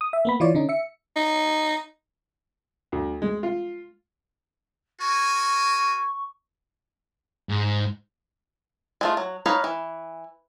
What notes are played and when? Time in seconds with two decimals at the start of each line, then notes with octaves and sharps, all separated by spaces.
0.01 D#6
0.13 E5
0.25 A#3 B3 B5
0.40 E3 F4 C#5 D5
0.54 D3 C#4 D#4
0.69 E5 C#7
1.16 D#4
2.92 D2
3.22 G#3
3.43 F4
5.00 F#4 A#4 G#5 C#6
7.49 G#2
9.01 G#3 A3 F4
9.17 F#3
9.46 D#4 B4 C#5 D#5 F5
9.64 E3